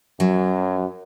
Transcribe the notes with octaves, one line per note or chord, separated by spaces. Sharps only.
F#2 F#3